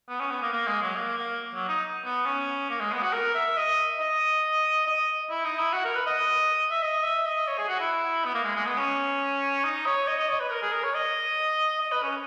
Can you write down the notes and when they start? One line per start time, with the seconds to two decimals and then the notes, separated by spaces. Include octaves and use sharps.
0.09 B3
0.20 C#4
0.31 B3
0.42 A#3
0.53 A#3
0.67 G#3
0.82 F#3
0.96 A#3
1.18 A#3
1.54 F#3
1.68 D#4
2.05 B3
2.26 C#4
2.70 A#3
2.80 G#3
2.92 B3
3.02 F#4
3.13 A#4
3.35 E5
3.57 D#5
4.00 D#5
4.87 D#5
5.30 E4
5.45 D#4
5.58 E4
5.73 F#4
5.85 A#4
5.95 B4
6.06 D#5
6.71 E5
6.82 D#5
7.03 E5
7.26 D#5
7.48 C#5
7.58 G#4
7.68 F#4
7.80 E4
8.25 B3
8.34 A#3
8.44 G#3
8.56 G#3
8.66 B3
8.77 C#4
9.64 D#4
9.86 C#5
10.07 D#5
10.19 D#5
10.29 C#5
10.40 B4
10.51 A#4
10.62 G#4
10.72 A#4
10.83 C#5
10.95 D#5
11.81 D#5
11.92 B4
12.03 C#4